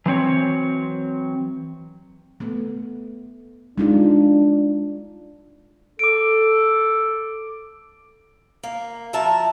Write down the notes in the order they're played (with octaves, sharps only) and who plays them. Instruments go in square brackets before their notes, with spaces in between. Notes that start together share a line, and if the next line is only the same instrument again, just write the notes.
[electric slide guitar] E3 F#3 C4 C#5
[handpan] A3 B3
[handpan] G#3 D#4 F4 [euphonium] D4
[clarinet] A4 [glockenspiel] D6 D7
[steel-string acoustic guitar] A#3
F3 E4 E5 A5 A#5